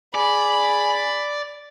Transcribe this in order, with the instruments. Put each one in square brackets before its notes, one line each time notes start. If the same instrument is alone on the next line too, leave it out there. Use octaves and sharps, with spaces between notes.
[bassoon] G#4 [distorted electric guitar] D5 [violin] B5